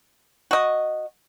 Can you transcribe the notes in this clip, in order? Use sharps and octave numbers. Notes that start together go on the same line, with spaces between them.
F#4 D#5